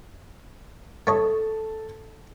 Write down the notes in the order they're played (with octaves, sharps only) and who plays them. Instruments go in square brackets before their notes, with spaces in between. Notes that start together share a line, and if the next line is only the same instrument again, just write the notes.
[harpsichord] A3 C#5 D#5 [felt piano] A4 A5